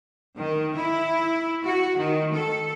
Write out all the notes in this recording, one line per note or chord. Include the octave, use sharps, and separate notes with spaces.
D#3
E4
F#4
D#3
A4